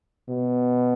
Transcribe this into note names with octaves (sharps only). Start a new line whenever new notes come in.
B2